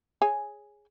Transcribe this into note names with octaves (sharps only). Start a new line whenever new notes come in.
G#4 C#5 G#5